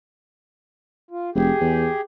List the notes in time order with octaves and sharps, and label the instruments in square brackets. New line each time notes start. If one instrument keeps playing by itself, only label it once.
[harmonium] F4
[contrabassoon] F1 [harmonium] G4 G#4
[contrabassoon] E2